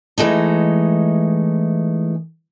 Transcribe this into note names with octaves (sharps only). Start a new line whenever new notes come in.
E3 G#3 A3 D#4